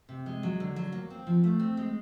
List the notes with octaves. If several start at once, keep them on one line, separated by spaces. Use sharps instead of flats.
C3
G#3
F#3
D3
F#3
A#3
C4
F3
A3
C4
G#3